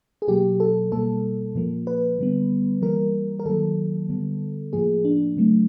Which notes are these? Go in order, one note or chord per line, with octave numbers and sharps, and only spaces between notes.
G#4
B2 F#3 A#3 G4
A4
B2 G3 A#3 A4
A#2 F3 A#3
B4
D3 G3 B3
E3 G3 A#3 A#4
A#4
D#3 F#3 A#3 A4
D3 G3 B3
A2 F3 A#3 G#4
D4
C#3 F#3 A3 C4